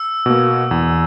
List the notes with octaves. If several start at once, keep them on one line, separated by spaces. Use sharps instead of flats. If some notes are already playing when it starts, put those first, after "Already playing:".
Already playing: E6
B2 A#3
E2